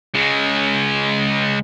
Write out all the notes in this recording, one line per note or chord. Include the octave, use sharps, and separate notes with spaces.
C#3 G#3